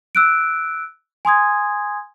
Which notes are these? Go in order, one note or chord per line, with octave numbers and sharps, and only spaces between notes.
E6 F#6 D7
G#5 C6 D#6 G#6